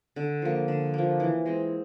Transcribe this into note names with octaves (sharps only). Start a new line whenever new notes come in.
D3
F3 A#3
D3
F3 A#3
E3
G#3 C4